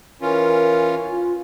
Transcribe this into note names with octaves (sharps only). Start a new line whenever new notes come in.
E3 C#4 F4 A#4
F4